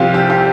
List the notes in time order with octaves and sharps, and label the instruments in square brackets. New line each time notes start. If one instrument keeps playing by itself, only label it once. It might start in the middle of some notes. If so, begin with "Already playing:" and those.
Already playing: [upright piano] C2 C3 F3 F4 G4
G4
G4